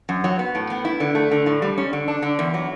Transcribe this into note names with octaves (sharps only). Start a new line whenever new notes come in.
F#2
F#3
B3
A2
B3
E4
D3
A3
D3
A2
G3
C#4
D3
D4
D3
E2
F#3